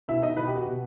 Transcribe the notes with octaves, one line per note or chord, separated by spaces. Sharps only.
B2 E4 E5
D#4 D#5
B2 B3 B4
G4
F#4
B2